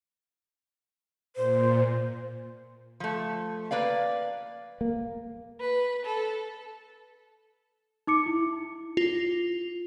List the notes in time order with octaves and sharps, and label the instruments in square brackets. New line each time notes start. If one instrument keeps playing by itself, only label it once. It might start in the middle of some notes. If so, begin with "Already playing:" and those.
[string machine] A#2 [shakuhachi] C5
[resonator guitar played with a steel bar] F3 A3
A#3 B4 D5 F5
[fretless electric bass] A#3
[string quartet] B4
A4
[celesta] D#4 D6 C#7
E4
[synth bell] F4